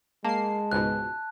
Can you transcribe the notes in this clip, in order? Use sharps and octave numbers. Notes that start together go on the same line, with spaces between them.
G#3 A#3 A5 C7
C#2 G#2 B2 F#6